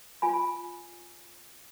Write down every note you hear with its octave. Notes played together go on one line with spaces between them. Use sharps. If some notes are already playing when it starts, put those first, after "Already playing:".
F4 G#5 B5